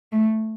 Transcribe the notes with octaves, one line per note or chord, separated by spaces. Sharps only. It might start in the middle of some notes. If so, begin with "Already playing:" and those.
A3